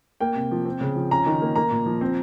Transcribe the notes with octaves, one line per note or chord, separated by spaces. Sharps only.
A#3 G5
C3
F3
C4
C#3
F3
C#4 A#5
D#3
A#3
A#3 A#5
A#2
F3
C4